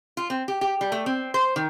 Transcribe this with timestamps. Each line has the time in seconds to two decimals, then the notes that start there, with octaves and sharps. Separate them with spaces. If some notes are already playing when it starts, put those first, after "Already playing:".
0.17 F4
0.30 C4
0.48 G4
0.61 G4
0.81 G3
0.92 A3
1.06 C4
1.34 C5
1.56 D#3